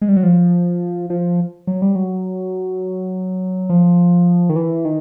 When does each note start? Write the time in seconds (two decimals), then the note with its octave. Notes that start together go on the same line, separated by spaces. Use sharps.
0.01 G#3
0.08 G3
0.16 F#3
0.23 F3
1.10 F3
1.67 F#3
1.82 G3
1.95 F#3
3.69 F3
4.49 D#3
4.56 E3
4.85 D#3